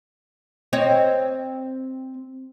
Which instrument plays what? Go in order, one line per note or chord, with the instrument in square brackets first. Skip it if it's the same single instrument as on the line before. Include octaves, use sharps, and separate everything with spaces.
[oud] C4 C#5 D#5